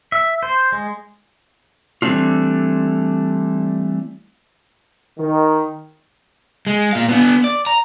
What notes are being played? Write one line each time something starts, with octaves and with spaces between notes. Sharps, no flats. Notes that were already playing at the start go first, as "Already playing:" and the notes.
E5
C5
G#3
E3 G3 A3 C4 D4 F4
D#3
G#3
A#2 F5
B3 D4
D5
A#5